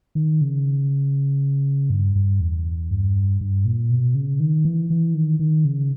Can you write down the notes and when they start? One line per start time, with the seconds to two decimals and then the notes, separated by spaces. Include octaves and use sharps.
0.15 D#3
0.41 C#3
1.90 G2
2.15 G2
2.41 E2
2.91 G2
3.41 G2
3.65 A#2
3.90 B2
4.15 C#3
4.40 D#3
4.65 E3
4.90 E3
5.14 D#3
5.39 D#3
5.65 C#3